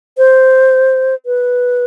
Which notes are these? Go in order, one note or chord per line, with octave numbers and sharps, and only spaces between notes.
C5
B4